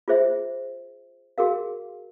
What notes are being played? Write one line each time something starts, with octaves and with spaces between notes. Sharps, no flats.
F4 G#4 C5 E5
F#4 G#4 A#4 F5